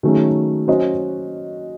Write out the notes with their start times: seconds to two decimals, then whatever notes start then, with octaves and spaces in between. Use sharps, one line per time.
0.03 D#3 F#3 A3 C#4 G#4
0.67 F#3 C#4 F#4 C5 D#5